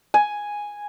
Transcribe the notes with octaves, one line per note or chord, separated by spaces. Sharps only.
G#5